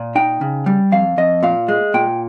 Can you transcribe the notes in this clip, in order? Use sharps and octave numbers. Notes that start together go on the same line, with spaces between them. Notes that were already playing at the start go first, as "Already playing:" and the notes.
Already playing: A#2
D#4 G5
C#3
G3
F2 F5
F2 D#5
A#2 F5
G#3
A#2 G5